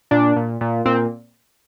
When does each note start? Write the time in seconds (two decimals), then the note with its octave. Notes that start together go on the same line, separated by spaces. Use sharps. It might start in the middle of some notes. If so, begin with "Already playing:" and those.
0.11 A#2 D4
0.36 A#2
0.61 A#2
0.85 A#2 C4